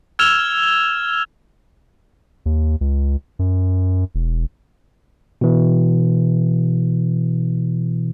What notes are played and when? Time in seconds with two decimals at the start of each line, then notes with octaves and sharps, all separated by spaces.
0.19 E6 F6 G#6 E7 F7 G7
2.46 D#2
2.81 C#2
3.39 F#2
4.15 E1
5.41 B2 E3